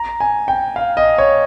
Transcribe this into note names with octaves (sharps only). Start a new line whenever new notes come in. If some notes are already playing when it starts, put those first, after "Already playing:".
Already playing: A#5
G#5
G5
F5
D#5
C#5